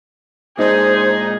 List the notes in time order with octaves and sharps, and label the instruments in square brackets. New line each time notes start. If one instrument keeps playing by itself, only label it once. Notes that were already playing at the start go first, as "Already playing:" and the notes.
[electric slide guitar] A#2 G#3 D5 [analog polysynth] D#4 [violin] G#4 [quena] C5